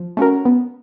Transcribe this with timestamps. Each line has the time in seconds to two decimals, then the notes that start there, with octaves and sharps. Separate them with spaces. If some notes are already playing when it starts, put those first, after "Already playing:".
Already playing: F3
0.17 A3 C#4 F#4 A#4
0.45 B3